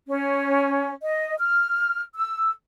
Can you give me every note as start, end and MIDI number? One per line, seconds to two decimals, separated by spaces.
0.08 0.91 61
1.03 1.34 75
1.39 2.01 89
2.14 2.52 88